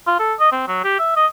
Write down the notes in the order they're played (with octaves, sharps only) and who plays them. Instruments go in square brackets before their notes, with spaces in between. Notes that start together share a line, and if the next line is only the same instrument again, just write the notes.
[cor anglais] F4
A4
D#5
C4
F#3
G4
E5
D#5